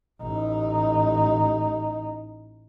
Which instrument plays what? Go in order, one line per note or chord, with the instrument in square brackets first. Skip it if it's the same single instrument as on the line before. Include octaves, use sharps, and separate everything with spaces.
[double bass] A1 D#4